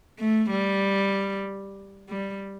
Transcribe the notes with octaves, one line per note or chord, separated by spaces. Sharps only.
A3
G3
G3